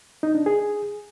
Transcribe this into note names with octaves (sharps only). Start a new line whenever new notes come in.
D#4
D4
G#4